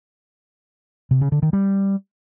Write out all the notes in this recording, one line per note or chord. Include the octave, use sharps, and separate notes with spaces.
C3
C#3
D3
D#3
G3